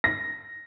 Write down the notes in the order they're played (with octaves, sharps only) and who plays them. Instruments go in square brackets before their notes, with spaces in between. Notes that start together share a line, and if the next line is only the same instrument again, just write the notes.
[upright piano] A#6